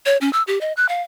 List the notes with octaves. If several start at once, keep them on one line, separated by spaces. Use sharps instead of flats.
C#5
C#4
E6
G4
D#5
F#6
F5